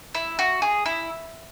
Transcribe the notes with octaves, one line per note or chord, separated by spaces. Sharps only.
E4
F#4
G#4
E4